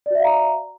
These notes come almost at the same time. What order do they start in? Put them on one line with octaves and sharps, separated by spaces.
D5 F#4 E5 F5 A#5